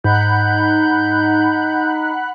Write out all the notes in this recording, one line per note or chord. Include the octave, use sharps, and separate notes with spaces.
G#2 D#4 F#5 B5 F#6 G6